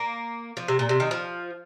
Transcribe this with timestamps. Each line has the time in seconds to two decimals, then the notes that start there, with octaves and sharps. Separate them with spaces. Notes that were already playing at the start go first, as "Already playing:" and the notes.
Already playing: A#3
0.57 F3
0.68 C3
0.79 A#2
0.89 C3
1.00 D#3
1.11 F3